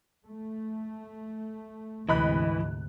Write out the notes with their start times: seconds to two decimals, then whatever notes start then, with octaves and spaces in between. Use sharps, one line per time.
0.26 A3
2.09 D2 G#2 C3 E3 D#5 B5 F#6